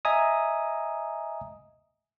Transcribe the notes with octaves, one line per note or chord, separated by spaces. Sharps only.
D#5 E5 G#5 A#5 D#6